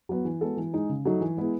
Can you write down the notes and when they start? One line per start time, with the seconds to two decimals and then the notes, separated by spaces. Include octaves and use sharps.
0.09 F#3 B3
0.25 E3
0.41 G#3 B3 F#4 A4
0.57 E3
0.73 G#3 D#4 G#4
0.89 C#3
1.05 F#3 A3 D#4
1.21 E3
1.37 G#3 B3 E4 G#4